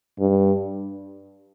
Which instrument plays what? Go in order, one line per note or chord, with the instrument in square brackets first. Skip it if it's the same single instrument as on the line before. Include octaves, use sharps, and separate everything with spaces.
[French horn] G2